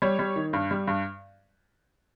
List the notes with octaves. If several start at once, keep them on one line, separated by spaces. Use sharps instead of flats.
G3 C#5
G3
D#3
G2
G3
G2